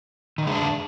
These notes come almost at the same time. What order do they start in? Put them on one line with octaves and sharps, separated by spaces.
D#3 D3 G#3 D4